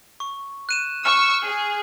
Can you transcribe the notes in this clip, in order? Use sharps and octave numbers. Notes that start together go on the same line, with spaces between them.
C#6
F#6 D#7 E7
C#6 E6 F6
G#4